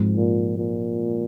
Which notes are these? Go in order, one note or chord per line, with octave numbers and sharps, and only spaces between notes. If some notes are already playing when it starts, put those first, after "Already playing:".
Already playing: G#2 F3 G#3 C4
A#2
A#2